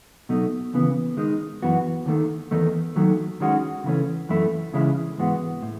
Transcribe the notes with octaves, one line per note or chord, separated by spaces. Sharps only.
B2 F#3 A3 D#4
D#2 C#3 E3 B3
D#3 G#3 D#4
F#2 E3 B3 F#4
D#2 D#3 A3
E2 D#3 A3 D#4
D#2 D#3 F#3 A3
D#3 G#3 C#4 F#4
C#3 E3 A3 C#4
F#2 E3 A3 E4
C#3 E3 G#3 C#4 E4
G#2 E3 G#3 B3 F#4
A2